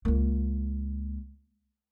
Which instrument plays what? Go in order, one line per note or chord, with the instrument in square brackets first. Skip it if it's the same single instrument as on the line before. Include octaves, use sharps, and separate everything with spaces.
[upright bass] C#2 A#3